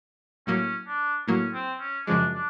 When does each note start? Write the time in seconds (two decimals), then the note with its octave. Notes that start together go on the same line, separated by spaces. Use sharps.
0.47 A2 F#3 A#3 C#4
0.87 D4
1.28 A2 F#3 A#3 C#4
1.54 C4
1.80 C#4
2.07 F#2 C#3 F3 G#3 D4
2.34 D4